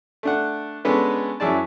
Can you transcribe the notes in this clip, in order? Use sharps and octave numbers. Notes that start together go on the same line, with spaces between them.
A3 D4 F#5
G#3 B3 C#4 D4 A4 B4
F#2 F#3 E4 G#4 D5 A5